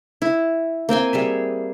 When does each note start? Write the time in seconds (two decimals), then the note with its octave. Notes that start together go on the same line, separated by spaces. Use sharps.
0.22 E4
0.89 A#3 C4 G5 G#5
1.13 G3 G#4 E5